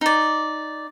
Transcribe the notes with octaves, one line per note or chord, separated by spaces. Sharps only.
D#4 D5